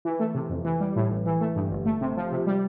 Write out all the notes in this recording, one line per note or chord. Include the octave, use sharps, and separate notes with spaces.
E3
A3
C3
F2
E3
G3
A2
A1
E3
A3
G2
G1
A3
C3
F3
C3
G3